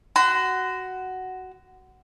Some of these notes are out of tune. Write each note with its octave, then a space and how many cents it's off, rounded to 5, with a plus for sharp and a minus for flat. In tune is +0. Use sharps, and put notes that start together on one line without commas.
F#4 +10 C6 -35